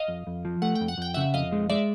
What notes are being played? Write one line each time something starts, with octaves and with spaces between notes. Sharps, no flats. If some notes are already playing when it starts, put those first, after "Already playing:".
Already playing: D#5 F5
F2
F2
F3
A3 F#5
G5
F2
F#5
F2 G5
C#3 E5 F#5
F2 D#5 F5
G#3
G#3 D5 E5